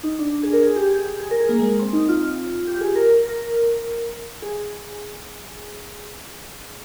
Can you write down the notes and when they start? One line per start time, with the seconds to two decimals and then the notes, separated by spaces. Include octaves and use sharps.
0.03 D#4
0.19 D4
0.43 G#4
0.53 A#4
0.63 G#4
0.76 G4
0.86 G4
0.91 G#4
1.20 G#4
1.31 A#4
1.40 G#4
1.49 A#3
1.59 G#3
1.79 C4
1.93 D#4
2.09 F4
2.67 G4
2.81 G#4
2.95 A#4
3.26 A#4
4.42 G#4
4.56 G#4